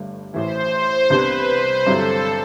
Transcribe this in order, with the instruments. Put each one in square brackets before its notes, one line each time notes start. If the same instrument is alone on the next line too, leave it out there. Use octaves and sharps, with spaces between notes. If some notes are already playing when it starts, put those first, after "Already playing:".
Already playing: [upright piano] G1 G2 A3
[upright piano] A1 A2 E3 [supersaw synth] C5
[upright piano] C2 C3 G3 B3 D4 [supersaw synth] B4
[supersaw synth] C5
[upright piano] G1 G2 F#3 C4 E4 [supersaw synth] A4